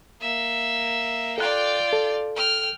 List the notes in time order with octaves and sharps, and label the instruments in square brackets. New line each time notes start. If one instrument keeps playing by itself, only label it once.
[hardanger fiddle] A#3 E5
[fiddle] F4 D5 [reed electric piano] A4 F#6 [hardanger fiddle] G5 D6
[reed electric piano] A4
[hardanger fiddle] G5 [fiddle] F6